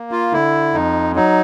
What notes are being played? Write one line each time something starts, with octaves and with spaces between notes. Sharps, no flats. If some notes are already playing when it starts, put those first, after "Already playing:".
Already playing: A#3
F4
D3 E4
F2 D#4
F#3 D#4